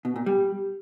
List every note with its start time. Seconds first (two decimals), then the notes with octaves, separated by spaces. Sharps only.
0.05 B2
0.16 A#2
0.26 G3